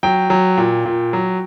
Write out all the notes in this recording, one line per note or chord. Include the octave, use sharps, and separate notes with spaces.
F#3 G5
F#3
A#2
A#2
F#3